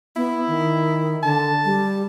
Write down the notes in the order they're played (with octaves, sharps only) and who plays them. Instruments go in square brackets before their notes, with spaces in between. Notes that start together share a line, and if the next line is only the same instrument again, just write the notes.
[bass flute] B3 [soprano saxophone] E4
[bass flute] D#3
[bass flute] D3 [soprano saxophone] A5
[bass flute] G3